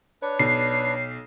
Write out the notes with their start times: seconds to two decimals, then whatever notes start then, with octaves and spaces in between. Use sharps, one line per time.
0.22 D4 B4 C#5
0.39 B1 C7